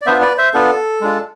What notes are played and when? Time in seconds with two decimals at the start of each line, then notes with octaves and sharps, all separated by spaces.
0.01 D5
0.06 B3 D4 F4 C5 E5
0.22 B4 D5
0.38 C5 E5
0.54 B3 D4 F4 A4
1.01 G#3 D4 F4